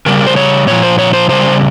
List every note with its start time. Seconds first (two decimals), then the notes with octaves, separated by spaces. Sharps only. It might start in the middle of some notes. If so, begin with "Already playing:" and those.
0.06 C#3 G3 A#4
0.27 C5
0.36 C#5
0.67 A#2 F3 C#5
0.83 C5
0.99 C#5
1.13 C5
1.29 C#3 G3 C5